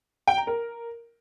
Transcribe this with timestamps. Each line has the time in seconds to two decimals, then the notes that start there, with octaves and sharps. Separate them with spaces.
0.27 G5
0.37 A#5
0.47 A#4